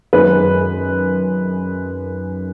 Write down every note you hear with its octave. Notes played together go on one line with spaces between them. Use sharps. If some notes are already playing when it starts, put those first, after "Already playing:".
F#2 D#3 G#3 B4